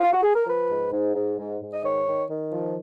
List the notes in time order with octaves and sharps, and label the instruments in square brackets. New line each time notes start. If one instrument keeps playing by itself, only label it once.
[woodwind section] F4
F#4
G#4
A#4
F3 B4
G#2
G#2
G#2
G#2
G#2
D#5
D#3 C#5
D#3
D#3
F3